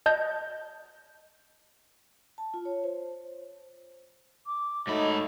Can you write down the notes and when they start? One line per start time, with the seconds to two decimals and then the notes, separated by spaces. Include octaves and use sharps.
0.06 D#5 A5 G6
2.38 A5
2.54 F4
2.65 C#5
2.84 C5
4.46 D6
4.87 G#2 F#3 A3 D#4 D#5 B5